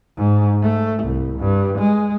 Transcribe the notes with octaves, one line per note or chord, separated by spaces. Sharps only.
G#2
A3
C2
G2
G#3